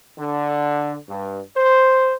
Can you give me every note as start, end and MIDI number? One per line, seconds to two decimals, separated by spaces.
0.18 0.97 50
1.08 1.41 43
1.57 2.14 72